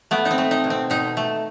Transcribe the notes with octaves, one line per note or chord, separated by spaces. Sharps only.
A3 B3
D#4
C4
A3
D#4
B2
C4
B2 D#4
A3